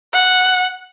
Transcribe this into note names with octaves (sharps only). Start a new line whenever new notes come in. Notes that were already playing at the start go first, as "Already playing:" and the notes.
F#5